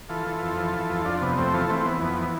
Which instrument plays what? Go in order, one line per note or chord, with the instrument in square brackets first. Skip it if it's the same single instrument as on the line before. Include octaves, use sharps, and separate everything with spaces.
[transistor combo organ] E3 F4 A4
E3
F2
E3
E3
F2
F2 D4 F4
C3 B3
F2 A3 C4
E3 F4 A4
E3 A3 C4
E3 B3
F2 B3
E3